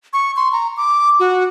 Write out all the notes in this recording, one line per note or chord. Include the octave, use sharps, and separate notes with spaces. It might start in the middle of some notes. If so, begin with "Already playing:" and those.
C#6
C6
A#5
D6
F#4